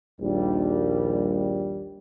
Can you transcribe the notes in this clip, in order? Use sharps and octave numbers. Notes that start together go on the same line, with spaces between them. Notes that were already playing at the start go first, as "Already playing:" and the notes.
A#1 D#2 G3